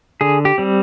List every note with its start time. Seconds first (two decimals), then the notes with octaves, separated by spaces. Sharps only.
0.21 D3 G#4
0.45 G4
0.58 G3 C4